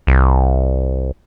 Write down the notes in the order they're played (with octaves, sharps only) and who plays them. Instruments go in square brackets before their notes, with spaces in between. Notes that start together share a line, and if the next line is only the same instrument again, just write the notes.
[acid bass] C2